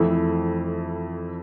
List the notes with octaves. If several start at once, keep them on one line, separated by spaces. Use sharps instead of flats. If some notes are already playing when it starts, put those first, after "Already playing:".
Already playing: F2 E3 A3 E4